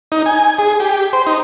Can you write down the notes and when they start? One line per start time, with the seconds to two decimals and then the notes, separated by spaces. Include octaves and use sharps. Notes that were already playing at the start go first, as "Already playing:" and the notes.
0.12 D#4
0.26 G#5
0.59 G#4
0.80 G4
1.13 C5
1.27 D#4